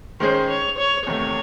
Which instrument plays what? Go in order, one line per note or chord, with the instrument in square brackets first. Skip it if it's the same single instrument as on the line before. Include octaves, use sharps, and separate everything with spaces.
[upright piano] D#3 G#3 C#4 G#4 [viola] C5
[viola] C#5
C#5
[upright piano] E2 C3 D#3 A3 [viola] C#5